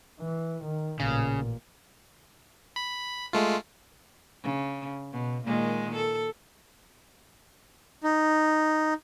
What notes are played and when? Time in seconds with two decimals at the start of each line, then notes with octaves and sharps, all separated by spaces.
0.20 E3
0.64 D#3
1.00 A1 A#2 C#3
2.76 B5
3.33 G#3 A3 F4
4.43 C#3
5.12 B2
5.44 A#2 D#3 G#3
5.95 A4
8.04 D#4